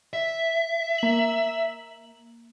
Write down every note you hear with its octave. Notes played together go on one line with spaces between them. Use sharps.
E5
A#3 F#7